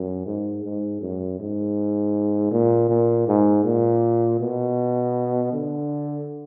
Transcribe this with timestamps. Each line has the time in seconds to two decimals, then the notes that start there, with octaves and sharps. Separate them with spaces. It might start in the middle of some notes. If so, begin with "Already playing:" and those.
Already playing: F#2
0.26 G#2
0.64 G#2
1.02 F#2
1.40 G#2
2.51 A#2
2.89 A#2
3.28 G#2
3.64 A#2
4.40 B2
5.52 D3